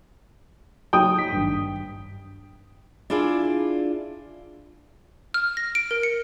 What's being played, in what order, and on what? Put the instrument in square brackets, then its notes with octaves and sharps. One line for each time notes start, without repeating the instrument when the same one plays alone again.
[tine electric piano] F#3 D#4 [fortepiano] G5 D#6
[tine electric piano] B6
G#1 G2
[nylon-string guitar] D4 E4 F4 G#4 D5
[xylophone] F6
A#6
D7
A#4
C#7